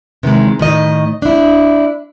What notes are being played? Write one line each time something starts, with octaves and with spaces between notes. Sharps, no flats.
C3 D#3 E3 G#3
A2 D#3 D#5
D4 E4